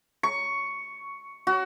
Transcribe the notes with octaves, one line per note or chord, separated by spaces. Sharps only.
C#6
F#4